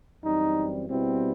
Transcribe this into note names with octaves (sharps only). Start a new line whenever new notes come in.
F#2 E3 G3 C4 D#4
B2 G3 B3 C4 E4